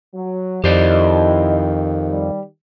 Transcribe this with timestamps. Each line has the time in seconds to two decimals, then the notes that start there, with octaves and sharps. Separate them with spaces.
0.14 F#3
0.64 F2 D#3 E4 G4 C5 D5 D#5
2.09 G3